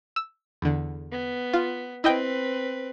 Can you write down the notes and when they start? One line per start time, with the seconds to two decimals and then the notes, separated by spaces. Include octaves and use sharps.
0.16 E6
0.62 E2 D3
1.11 B3
1.53 F4
2.04 C4 E4 B4 D#5 G5